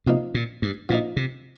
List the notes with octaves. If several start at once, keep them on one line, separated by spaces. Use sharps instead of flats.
C3 F3 A#3 D#4
A#2
G2
A#2 F3 A#3 D#4
C3